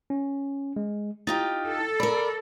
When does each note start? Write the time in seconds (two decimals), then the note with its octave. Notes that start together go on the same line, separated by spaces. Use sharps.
0.10 C#4
0.76 G#3
1.27 D#4 F4 G4 A6
1.67 A4
2.00 A#4 D5 B5